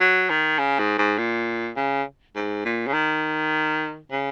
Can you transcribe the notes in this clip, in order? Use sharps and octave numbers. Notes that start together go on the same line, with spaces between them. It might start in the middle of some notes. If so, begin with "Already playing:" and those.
F#3
D#3
C#3
G#2
G#2
A#2
C#3
G#2
A#2
C#3
D#3
C#3